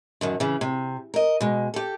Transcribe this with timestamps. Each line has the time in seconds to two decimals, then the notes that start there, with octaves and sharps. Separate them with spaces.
0.21 F#2 D3 D#3
0.40 C#3 E3
0.61 C3
1.14 A#4 D#5
1.41 B2 G#3
1.74 G4 A4